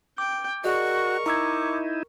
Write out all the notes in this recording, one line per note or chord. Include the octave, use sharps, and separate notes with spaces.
G5 D6
F#4 G#4 A#4 D5 D#5 C#6
D#4 E4 A#5 D6 E6 G#6